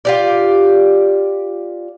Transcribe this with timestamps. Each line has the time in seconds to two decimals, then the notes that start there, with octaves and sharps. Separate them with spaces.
0.05 F4 G4 D5